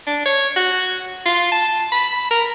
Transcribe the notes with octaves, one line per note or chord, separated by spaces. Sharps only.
D4
C#5
F#4
F4
A5
B5
A#4